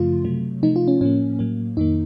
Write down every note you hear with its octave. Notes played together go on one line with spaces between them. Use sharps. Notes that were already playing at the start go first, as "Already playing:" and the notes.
Already playing: F#2 C#3 F3 A3 F4
C3 F#3 A3
C3 F3 A3 D#4
F4
C#4
A2 F3 A#3 C#4
A2 F#3 A#3
F2 D#3 A#3 D#4